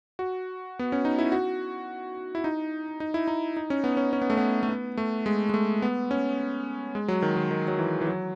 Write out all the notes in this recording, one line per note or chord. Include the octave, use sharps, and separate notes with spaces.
F#4
B3
C#4
D#4
E4
F#4
E4
D#4
D#4
E4
D#4
D#4
C#4
B3
C#4
C#4
B3
A3
B3
A3
B3
A3
G#3
G#3
A3
B3
C#4
G#3
F#3
D#3
D#3
D#3
F#3
E3
E3
F#3